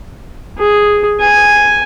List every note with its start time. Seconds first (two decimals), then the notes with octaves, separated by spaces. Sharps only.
0.58 G#4
1.20 G#5